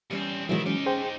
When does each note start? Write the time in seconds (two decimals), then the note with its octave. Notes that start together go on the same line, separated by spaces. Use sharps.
0.11 E2 G3 C4 C#4
0.49 C3 D#3 E3 F#3 G#3 C4 E4
0.66 C#4 D#4 G4
0.86 G#4 C5 G5